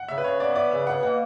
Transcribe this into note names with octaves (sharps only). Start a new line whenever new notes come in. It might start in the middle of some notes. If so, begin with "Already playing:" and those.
Already playing: F#5
C#3 E5
B4
C#3 C#5
B3 D5
E3 D5
C#3 E5
B2 F#5
A#3 F#5